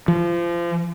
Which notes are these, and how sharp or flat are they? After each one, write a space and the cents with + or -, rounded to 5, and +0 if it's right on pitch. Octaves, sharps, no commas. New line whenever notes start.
F3 -30